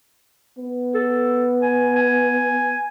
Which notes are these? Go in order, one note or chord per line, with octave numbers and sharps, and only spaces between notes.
B3
A4
G#5
G#5